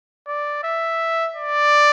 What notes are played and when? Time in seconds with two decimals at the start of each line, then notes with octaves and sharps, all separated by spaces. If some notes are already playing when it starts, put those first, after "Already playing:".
0.27 D5
0.63 E5
1.36 D5